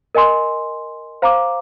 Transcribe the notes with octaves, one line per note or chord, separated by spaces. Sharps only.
A#4 D#5 G#5 C6
C5 F5 A#5 D6